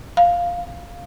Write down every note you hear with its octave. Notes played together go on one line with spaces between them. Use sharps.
F5